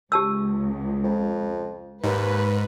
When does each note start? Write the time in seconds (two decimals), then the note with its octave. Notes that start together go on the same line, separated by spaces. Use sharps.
0.12 C#2 G4 A5 E6
1.04 F2
2.04 D#2 G#2 B4